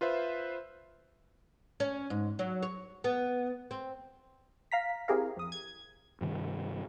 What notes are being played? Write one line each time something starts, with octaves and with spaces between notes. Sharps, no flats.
F4 B4 C5 E5
C#4
G#2
F#3
C#5
B3
C4
F5 A#5 B6
C4 E4 G4 G#4 A#4 F5
F2 D#6
G#6
G2 C3 D#3 G3